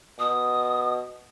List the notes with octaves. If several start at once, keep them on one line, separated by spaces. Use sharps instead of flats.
B2 D#6